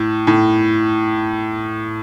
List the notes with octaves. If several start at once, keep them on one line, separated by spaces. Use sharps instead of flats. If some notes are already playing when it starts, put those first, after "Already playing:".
Already playing: A2
A2